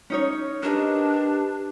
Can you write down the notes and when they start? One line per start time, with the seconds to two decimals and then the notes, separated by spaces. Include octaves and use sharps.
0.10 C#4 D#4 C#5
0.63 D4 G4 A#4 B4 D#5